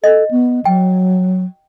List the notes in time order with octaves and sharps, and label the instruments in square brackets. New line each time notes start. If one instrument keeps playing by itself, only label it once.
[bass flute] A4 [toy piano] D#5
[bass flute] B3
[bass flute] F#3 [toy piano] G5